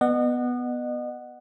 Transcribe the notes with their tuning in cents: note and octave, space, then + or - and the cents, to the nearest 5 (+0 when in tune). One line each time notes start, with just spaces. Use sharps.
B3 +0 D#5 -35 F#5 +0